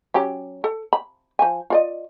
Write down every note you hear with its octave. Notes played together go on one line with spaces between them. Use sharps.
F#3 C#4 G4
A4
B5
F3 G#5
F4 D5 D#5